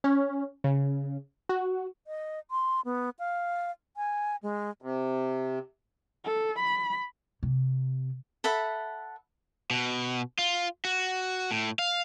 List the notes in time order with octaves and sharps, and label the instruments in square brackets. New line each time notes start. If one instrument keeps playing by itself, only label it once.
[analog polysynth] C#4
C#3
F#4
[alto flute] D#5
C6
B3
F5
G#5
G#3
[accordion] C3
[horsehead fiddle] A4
B5
[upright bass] C3
[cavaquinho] A4 E5 F#5 B5
[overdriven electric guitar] B2
F4
F#4
A2
F5